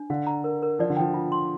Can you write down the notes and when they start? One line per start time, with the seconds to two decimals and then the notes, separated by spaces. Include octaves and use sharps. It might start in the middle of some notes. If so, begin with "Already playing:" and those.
Already playing: D4
0.10 D3 F5
0.27 A#5
0.44 A#4
0.62 A#4
0.79 F3 D5
0.90 D3
0.97 F3 G5
1.14 F4
1.32 C6